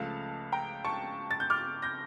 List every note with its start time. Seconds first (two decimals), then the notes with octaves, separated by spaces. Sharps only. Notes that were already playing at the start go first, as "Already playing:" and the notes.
Already playing: C#2 C#3 F3 A3 F5 A5
0.52 G5 A#5
0.85 A5 C#6
1.31 A6
1.40 G6
1.50 D6 F6
1.82 G6 A#6